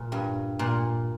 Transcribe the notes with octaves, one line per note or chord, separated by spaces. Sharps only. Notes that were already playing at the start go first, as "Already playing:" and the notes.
Already playing: A#2
G2
A#2